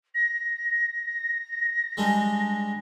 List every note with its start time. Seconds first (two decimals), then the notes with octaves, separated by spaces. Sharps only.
0.14 A#6
1.97 G3 G#3 D4